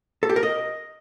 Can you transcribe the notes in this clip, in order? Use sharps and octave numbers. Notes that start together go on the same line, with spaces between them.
A4
G4
A#4
D#5